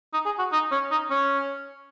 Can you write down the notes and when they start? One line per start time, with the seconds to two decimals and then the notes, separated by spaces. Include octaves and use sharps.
0.13 D#4
0.26 G#4
0.39 F#4
0.53 D#4
0.72 C#4
0.91 D#4
1.10 C#4